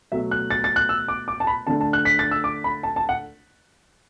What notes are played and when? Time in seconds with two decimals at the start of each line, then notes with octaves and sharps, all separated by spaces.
0.12 B2 F#3 A3 E5
0.31 F#6
0.50 A6
0.64 A6
0.76 F#6
0.89 E6
1.08 D6
1.28 D6
1.40 A5
1.47 B5
1.67 D3 A3 A5
1.81 A5
1.93 F#6
2.05 B6
2.19 A6
2.31 E6
2.44 D6
2.64 B5
2.83 A5
2.96 A5
3.09 F#5